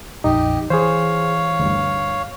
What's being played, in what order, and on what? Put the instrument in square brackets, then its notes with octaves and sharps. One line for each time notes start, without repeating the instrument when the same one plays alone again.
[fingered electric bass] A#1 F2 [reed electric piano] D#4 [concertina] G4 D#5
[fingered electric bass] E3 [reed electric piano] G#4 C5 [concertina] C#5 F5
[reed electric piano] D2 G2